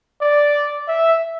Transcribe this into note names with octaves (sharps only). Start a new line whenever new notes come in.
D5
E5